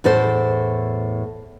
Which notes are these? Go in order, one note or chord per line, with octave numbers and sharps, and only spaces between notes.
E2 A2 A4 C5